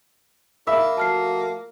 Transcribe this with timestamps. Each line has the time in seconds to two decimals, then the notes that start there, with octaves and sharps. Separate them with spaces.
0.67 E2 A#3 D#4 E5 B5
0.98 F3 A3 F#4 A5 F6 C7